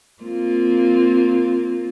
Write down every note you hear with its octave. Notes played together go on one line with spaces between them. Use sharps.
A#3 C4 F4